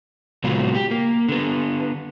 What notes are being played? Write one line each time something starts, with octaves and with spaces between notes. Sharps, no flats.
A#2 C#3 F#3 G#3 B3 F4
G4
A#3
D3 B3